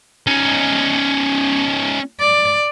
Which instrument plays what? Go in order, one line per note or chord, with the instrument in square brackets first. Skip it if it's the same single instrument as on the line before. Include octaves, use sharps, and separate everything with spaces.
[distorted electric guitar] C#4 D#4
[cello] D5